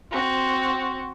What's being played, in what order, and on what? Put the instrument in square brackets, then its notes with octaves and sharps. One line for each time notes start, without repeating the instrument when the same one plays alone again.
[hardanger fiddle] C4 F#4